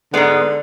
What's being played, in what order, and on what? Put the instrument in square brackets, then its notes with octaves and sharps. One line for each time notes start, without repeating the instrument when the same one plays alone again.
[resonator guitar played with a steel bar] G#2 G#3 B3 [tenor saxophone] D3